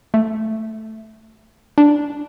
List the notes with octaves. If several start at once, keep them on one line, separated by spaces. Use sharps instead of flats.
A3
D4